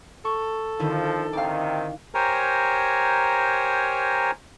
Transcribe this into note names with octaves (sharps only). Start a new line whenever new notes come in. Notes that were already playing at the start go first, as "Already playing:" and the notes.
A4 C#6
F2 D3 D#3 F3 E4
C3 D#3 D5 F5
G4 A#4 C5 C#5 G#5 A#5